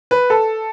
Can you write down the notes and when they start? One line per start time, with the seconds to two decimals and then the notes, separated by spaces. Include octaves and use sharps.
0.11 B4
0.30 A4